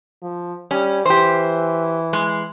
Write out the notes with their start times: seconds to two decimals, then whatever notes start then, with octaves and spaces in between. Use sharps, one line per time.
0.22 F3
0.71 G3 C#4
1.05 E3 G4 C5
2.13 G#3